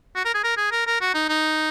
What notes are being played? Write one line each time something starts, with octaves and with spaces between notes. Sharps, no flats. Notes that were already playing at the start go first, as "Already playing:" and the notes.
F#4
A#4
G#4
A#4
G#4
A#4
A#4
F#4
D#4
D#4